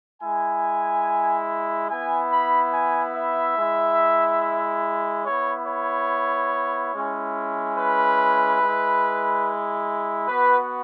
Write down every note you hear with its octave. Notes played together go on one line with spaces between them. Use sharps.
G#3 E4 G#5
B3 E4 G#5
B5
G#5
E5
G#3 E4
B3 E4 C#5
C#5
G#3 C#4 E4
B4
G#3 E4
B3 F#4 B4